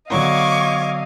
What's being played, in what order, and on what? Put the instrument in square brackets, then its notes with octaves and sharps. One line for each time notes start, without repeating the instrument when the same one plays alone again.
[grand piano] D3 F#3 B3 [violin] D#5 F5 [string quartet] C#6 D6 G#6